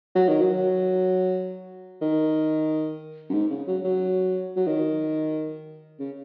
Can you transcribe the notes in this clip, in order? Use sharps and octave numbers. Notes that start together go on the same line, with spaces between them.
F#3
D#3
F#3
D#3
F#2
G#2
C#3
F#3
F#3
F#3
D#3
C#3